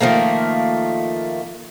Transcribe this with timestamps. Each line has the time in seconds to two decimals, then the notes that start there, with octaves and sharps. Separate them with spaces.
0.01 D#3 F3 A3 A#3